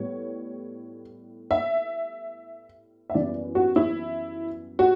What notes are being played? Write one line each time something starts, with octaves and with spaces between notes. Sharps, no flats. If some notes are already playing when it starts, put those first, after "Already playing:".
Already playing: A2 G3 B3 C#5
E5
E5
F#2 E3 G3 B3 D5
F#4
E4
F#4